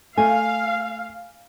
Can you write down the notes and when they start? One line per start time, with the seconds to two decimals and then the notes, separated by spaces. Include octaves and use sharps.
0.18 A3 F5 G#5